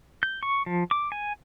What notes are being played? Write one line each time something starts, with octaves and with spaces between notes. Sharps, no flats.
G6
C#6
F3
D6
G#5